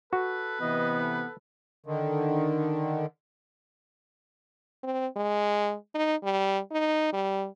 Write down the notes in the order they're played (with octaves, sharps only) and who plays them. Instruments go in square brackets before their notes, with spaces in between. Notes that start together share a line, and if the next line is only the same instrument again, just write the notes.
[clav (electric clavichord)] F#4 [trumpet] A4 [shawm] B4
[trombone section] C3 E3 B3 [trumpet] D#5
[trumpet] A4
[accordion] D3 D#3
[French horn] C4
G#3
D#4
G3
D#4
G3